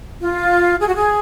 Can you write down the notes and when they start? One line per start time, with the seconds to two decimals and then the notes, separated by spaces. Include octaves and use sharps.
0.21 F4
0.80 G#4
0.88 F#4
0.95 G#4